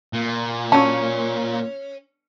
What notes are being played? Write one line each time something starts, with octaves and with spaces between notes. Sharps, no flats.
A#2
F#3 C#4 A5